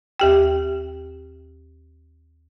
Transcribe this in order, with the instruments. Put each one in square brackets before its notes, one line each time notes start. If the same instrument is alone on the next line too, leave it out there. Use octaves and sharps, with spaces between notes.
[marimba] D#2 G4 G5